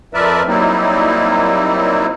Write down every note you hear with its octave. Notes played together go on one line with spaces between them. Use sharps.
F2 F3 A#4 B4 D5 E5
F#3 G3 A#3 C4 D#4 E4